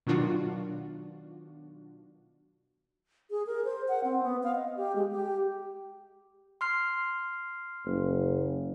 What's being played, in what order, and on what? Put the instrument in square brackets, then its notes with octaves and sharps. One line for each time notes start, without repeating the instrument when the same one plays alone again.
[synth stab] B2 D#3 F#3 D4 F4 F#4
[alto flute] G#4
A#4
C5
F#5
C4
B3
F5
D#5
G4
G#3
G4
[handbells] C6 F6 C7
[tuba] F#1